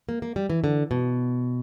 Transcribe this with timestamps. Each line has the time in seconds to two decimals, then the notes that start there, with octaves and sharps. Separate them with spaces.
0.09 A#3
0.22 A#3
0.36 G3
0.50 E3
0.64 D3
0.91 B2